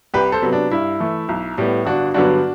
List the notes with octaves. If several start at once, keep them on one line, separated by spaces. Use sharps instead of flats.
C2 G4 B4
A4 C5
C3 F#3 B3
D4
G2 E4
E3 A3
B1
A2 G3 B3
G1 D4 F#4
G2 D3 F#3 B3 D4 F#4